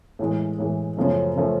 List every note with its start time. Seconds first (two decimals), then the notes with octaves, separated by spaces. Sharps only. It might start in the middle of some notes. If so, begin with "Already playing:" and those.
0.19 A2 E3 G#3
0.58 A2 E3 G#3
0.97 F#2 C#3 F3 A3 C#4
1.36 C#3 F3 A3 C#4